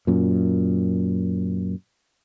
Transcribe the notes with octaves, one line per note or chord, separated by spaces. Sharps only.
F#2 A#2